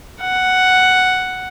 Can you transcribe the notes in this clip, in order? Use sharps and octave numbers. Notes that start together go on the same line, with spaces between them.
F#5